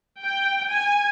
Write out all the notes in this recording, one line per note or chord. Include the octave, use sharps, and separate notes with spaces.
G5
G#5